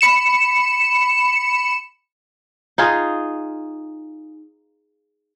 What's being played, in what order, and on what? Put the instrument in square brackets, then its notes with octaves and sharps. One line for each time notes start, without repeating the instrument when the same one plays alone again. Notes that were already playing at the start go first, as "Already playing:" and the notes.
[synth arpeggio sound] B5 C#7 E7
[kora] D#4 F4 G#4